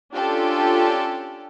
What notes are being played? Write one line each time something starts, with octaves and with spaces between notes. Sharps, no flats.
C#4 D4 F4 G4 A4